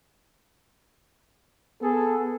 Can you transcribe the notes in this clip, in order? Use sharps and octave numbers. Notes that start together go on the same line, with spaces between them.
B3 G#4 A4